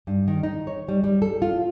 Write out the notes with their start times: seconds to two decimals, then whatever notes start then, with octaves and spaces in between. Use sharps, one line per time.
0.07 G2
0.27 D#3
0.43 D#4
0.67 C#5
0.88 G3
1.04 G3
1.22 A4
1.42 F4